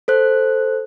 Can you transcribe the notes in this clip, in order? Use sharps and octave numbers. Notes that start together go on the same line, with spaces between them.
A4 C5 F#6